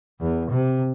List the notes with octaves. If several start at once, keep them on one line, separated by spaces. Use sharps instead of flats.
E2
C3